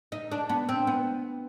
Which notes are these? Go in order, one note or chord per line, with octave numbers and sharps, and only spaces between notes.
D#4
D4
B3
C4
B3